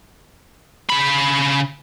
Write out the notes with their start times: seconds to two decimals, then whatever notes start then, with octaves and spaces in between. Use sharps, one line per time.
0.89 C#3 B5